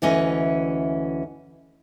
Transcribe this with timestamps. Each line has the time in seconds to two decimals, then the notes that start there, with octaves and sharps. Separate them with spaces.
0.02 D2 E3 C#4 D#5